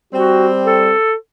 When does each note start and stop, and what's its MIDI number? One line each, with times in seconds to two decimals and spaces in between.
0.13 0.94 55
0.13 0.94 60
0.13 0.48 66
0.66 1.14 69